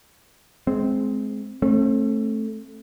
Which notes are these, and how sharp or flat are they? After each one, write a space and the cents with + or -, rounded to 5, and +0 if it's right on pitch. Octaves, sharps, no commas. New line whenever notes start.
G#3 +25 C4 -5
A3 +0 C4 +40